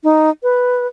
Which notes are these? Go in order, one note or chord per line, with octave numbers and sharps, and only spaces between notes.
D#4
B4